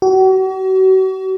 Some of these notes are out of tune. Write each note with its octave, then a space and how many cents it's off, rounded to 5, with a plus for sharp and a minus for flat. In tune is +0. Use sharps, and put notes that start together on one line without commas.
F#4 +40